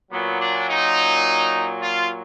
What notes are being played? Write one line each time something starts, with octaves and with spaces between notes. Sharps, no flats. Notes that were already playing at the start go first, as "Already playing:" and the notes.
A#2 F#3 B3
D4
D#4
F4